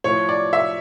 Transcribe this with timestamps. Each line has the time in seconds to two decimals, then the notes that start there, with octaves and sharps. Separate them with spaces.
0.04 A2 F3 C#5
0.29 D5
0.53 E5